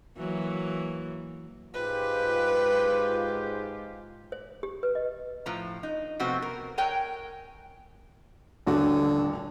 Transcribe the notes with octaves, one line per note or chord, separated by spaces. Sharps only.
E3 F#3 A#3
G#2 F4 G4 B4
C5
G4
B4
D#5
A2 F3 A#5
D#4
C3 F3 A3 B3 C4 F#4
A#4
A#4 C#5 G5 G#5 A#5
D#1 A1 D3 F#4